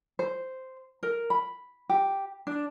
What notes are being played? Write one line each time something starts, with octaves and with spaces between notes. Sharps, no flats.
C5
A#4
B5
G4
D4